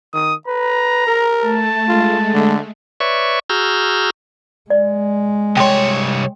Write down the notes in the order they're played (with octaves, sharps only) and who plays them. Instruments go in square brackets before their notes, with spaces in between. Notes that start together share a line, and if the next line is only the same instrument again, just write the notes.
[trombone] D#3 [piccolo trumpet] D#6
[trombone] B4 [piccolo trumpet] A#5
[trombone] A#4
[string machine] A3 [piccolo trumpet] A5
[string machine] G#3 A3 [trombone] F4
[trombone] D3
[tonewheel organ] B4 C#5 D5 E5 C#6
F#4 G#4 A#5 E6 F6 G6
[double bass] G#3 [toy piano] D5
[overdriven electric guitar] C2 C#5 [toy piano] G5 C6